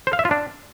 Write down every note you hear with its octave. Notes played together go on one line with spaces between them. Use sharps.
C5
F5
E5
F4
D4